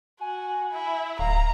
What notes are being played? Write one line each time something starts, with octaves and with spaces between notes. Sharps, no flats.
F#4 G#5
E4
D1 F5 A#5